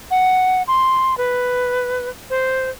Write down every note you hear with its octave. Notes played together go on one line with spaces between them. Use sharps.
F#5
C6
B4
C5